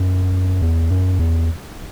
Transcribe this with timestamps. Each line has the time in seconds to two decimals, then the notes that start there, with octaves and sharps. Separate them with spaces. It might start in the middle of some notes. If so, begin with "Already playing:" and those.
Already playing: F#2
0.62 E2
0.91 F#2
1.19 E2